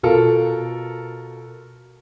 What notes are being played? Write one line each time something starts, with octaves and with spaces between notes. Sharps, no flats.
B2 F4 A4 A#4